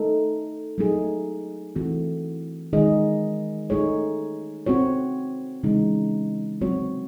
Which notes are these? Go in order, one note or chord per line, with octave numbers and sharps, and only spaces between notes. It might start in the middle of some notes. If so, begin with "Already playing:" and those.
Already playing: A3 D#4 A4
F#3 A3 D#4 G#4
E3 A3 C4 F#4
D#3 G#3 D#4 G#4 D#5
A3 D#4 G#4 C#5
C4 F#4 C#5
C#3 E3 G#3 D#4
F#3 C4 F#4 C#5